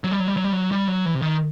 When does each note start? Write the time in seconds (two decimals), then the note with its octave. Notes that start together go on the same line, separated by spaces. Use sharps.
0.04 F#3
0.11 G3
0.20 F#3
0.28 G3
0.37 F#3
0.44 G3
0.52 F#3
0.72 G3
0.88 F#3
1.06 E3
1.14 C3
1.22 D#3